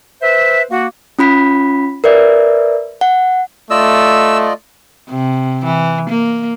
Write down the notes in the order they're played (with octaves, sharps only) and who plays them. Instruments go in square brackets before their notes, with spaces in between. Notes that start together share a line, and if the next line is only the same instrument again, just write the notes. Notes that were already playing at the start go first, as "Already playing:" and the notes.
[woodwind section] B4 C5 E5
A#3 F#4
[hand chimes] C#4 F4 B5 B6
A#4 B4 D5 E5
F#5
[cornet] A3 [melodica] F4 D5 D#5 [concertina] E6
[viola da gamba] C3
E3
A#3